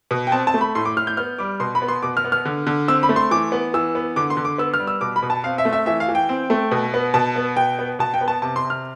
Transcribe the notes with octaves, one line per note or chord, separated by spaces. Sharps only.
B2
G5
C4 A5
A5
A3
B5
A2 C6
D6
A2 F6
G6
B3 F6
G3 D6
B2 C6
B5
B3
C6
B2 D6
F6
B3
F6
D3
D3
C4 E6
B5
A3
C6
E3 D6
B3
E3 E6
B3
D3 D6
C6
D3
D6
B3 E6
F6
G3
E6
B2 D6
B5
B2
A5
C4 F5
E5
A3
E5
E3 E5
F5
E3
G5
C4
A3
B2
B3
B2 A5
B3
B2 G5
B3
B2 A5
G5
B3
A5
C3 A5
C6
C3
F6